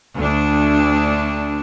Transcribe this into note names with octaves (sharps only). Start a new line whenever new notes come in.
D2 D4